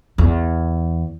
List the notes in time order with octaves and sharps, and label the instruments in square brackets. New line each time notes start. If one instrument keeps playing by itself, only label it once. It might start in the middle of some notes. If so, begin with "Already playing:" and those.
[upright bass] E2